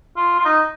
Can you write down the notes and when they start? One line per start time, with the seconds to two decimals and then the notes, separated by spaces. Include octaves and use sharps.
0.17 F4
0.39 F4
0.45 D#4